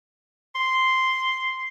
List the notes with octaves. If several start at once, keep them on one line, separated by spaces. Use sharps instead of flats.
C6